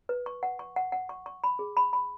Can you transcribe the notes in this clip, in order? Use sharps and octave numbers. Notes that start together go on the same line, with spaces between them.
B4
C#6
F#5
C#6
F#5
F#5
C#6
C#6
B5
G#4
B5
B5